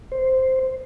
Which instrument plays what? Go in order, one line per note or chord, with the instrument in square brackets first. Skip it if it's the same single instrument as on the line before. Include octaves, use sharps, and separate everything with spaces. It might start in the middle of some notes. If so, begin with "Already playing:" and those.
[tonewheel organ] C5